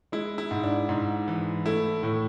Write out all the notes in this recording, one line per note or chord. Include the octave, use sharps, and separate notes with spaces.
G#3 E4
E4
G#2
D4
G#2
E3
A3 E4
A2